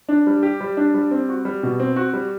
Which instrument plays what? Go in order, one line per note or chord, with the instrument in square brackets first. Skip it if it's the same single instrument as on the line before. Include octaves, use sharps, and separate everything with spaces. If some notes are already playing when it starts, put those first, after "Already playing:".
[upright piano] D4
G3
G4
G3
D4
G3
C4
F#4
G3
B2
C4
F#4
G3